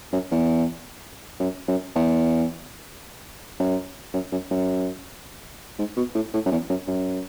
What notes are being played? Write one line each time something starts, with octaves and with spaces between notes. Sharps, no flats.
F#2
E2
F#2
F#2
E2
F#2
F#2
F#2
F#2
G#2
B2
A2
A2
F#2
E2
F#2
F#2